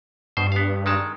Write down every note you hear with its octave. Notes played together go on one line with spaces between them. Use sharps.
G2 B2 C5
B3 F5
D#3 G#3 A5